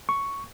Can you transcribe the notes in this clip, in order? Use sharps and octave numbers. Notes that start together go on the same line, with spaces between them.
C#6